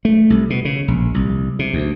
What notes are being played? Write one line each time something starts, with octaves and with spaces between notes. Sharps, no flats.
A3
C2
B2
C#3
A#1
C2
C3
D2